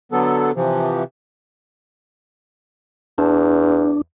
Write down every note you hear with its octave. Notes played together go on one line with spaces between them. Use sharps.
D3 F#3 B3 A4
C3 E3 F3
E2 D4